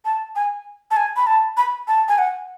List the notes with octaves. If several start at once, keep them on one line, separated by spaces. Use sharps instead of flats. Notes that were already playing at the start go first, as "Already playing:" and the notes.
A5
G#5
A5
G#5
B5
A5
B5
A5
G#5
F#5